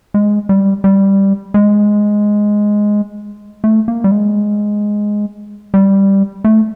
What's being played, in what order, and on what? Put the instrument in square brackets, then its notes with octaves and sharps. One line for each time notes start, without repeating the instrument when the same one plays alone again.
[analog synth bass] G#3
G3
G3
G#3
A3
A#3
G3
G#3
G3
A3